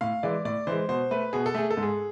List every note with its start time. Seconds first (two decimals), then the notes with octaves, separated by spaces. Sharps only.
0.01 A2 F5
0.23 E3 G#3 D5
0.45 A2 D5
0.67 E3 G#3 C5
0.89 B2 C5
1.11 A3 B4
1.33 B2 G#4
1.46 A4
1.55 A3 G#4
1.70 A4
1.77 G#2
1.83 G#4